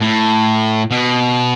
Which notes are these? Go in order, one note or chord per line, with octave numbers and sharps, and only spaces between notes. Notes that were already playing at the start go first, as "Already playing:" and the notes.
A2
B2